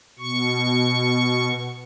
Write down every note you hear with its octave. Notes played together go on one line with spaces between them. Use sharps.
B2 C#6